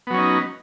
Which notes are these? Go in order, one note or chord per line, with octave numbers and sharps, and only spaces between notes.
F#3 B3 C#4 D#4